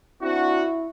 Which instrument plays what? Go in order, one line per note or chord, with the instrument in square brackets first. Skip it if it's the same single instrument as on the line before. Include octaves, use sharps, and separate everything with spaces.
[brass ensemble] C4 D4 F#4 [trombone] E4